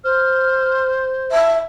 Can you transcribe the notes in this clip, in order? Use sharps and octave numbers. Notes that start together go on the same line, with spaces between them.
C5 F6
E5 A5